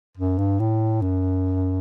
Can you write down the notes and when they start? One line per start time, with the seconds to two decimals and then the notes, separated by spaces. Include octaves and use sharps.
0.17 F#2
0.38 G2
0.59 A2
1.02 F#2